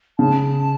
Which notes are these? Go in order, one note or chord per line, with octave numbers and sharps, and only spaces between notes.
C#3 A5